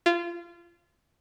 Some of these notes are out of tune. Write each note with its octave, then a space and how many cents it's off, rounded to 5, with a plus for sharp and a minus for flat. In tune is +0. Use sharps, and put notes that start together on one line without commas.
F4 -25